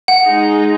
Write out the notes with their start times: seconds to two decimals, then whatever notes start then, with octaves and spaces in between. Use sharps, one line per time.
0.08 F#5
0.24 G#3 D#4 G#4